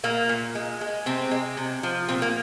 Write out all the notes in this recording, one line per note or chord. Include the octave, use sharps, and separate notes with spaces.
A#2 A#3
A#2
G#3
G#3
C3 C4
G#3
C3
F3
A#2 C4
A#3